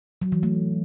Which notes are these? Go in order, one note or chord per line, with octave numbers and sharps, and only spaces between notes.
F#3
E3
A3